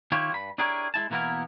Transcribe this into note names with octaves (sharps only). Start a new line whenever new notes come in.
D#3 E4 F4 G4 C#5
G2 B5
D4 E4 G4 G#4 A#4 C#5
G#3 E4 A5
B2 E3 A#3 B3 E4 A#4